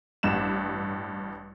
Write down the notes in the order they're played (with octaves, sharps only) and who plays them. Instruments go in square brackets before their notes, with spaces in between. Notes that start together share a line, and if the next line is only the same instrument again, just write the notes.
[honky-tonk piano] A1 G2 E7